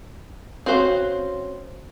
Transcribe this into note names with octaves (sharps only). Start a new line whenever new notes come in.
C4 C#4 F#4 C5 F5